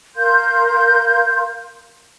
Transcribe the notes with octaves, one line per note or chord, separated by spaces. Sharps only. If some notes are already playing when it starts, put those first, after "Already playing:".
A#4 F5 C6 G6